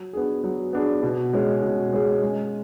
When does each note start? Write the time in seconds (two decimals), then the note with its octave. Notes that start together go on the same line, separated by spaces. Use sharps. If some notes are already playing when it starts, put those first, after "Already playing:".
Already playing: F#3
0.13 B3 D4 G#4
0.44 F#3
0.73 B3 D4 G#4
1.03 B2
1.33 G#3 C#4 G#4
1.62 B2
1.93 G#3 C#4 G#4
2.23 G#3